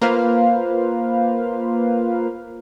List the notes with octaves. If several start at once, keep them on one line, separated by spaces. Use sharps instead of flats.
A#3 F4 B4 C5 F5